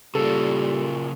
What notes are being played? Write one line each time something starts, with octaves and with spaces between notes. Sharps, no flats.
A#2 C#3 G3 A#3 A4